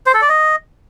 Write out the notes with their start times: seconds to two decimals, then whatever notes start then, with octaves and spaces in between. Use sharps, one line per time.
0.06 C5
0.14 A4
0.22 D5
0.29 D#5